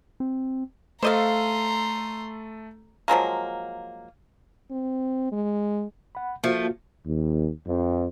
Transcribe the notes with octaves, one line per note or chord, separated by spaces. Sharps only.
C4
A3 A4 C5 D#5 F5 A#5 C6
F3 F#3 G#3 A#3
C4
G#3
F#5 B5
F3 A3 A#3 F4 F#4
D#2
F2